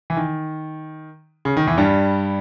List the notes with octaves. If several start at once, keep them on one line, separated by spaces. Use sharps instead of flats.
E3
D#3
C#3
D#3
E2 E3
G2 G3